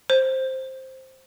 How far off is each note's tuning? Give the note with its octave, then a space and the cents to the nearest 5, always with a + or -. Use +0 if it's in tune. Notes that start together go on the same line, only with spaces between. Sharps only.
C5 +5